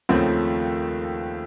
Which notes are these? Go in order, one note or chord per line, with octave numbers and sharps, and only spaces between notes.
D#2 C#3 F3 A3 C4